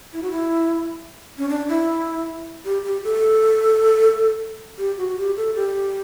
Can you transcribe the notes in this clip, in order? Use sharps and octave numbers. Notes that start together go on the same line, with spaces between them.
E4
F#4
E4
C#4
D4
E4
G4
G4
A4
G4
F#4
F#4
G4
A4
G4